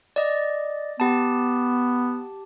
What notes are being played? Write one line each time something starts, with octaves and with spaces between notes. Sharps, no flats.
D5 D#5
B3 G4 A5